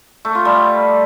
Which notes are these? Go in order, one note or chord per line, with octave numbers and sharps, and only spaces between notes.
A3
F4
G3